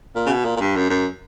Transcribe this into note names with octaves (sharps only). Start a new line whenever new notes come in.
A#2
C#3
B2
A#2
A#2
G2
F#2
F#2